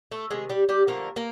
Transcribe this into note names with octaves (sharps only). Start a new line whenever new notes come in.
A3 A4
C3 D#3 G#3 G#4
G3 G4
G3 G4
D3 F3 A3 A#3 A#4
A#3 A#4